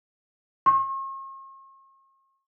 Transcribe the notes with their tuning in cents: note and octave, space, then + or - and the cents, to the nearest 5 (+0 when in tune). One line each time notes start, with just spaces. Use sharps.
C#6 -45